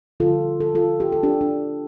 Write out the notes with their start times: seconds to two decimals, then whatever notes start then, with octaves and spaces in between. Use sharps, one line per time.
0.20 D3 G3 F4 A4
0.60 A4
0.75 F4 A4
1.00 G4
1.12 A4
1.23 D4 G4
1.41 D4